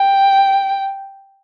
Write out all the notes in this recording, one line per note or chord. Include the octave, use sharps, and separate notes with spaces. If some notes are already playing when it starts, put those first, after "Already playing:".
Already playing: G5